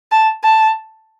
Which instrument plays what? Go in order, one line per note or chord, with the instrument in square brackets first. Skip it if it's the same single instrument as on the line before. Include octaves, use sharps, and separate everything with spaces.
[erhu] A5
A5